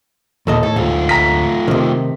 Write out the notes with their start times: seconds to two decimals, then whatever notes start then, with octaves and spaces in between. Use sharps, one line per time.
0.47 D#2 A#2 A4 D#5
0.63 A2 A4
0.76 D2 G#2 A3 F4
1.09 A#5 B6
1.68 C3 D#3